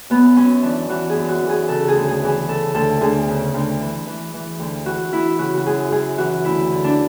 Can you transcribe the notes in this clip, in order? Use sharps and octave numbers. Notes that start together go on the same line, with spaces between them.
F#2 B3
F#2 C#4
E3 D4
E3 F#4
G#4
F#2
F#4
E3
G#4
C#3 A4
G#4
D2
G#4
E3
G#4
C#3 A4
D2 A4
D2 G#4
C#3
D2
E3
E3
E3
D2
E3 F#4
E3 E4
C#3 F#4
F#4
F#2 G#4
F#2 G#4
E3 F#4
D2 E4
D3
D4